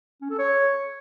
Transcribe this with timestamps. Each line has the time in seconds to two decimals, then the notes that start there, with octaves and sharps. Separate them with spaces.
0.21 C#4
0.30 A4
0.38 C#5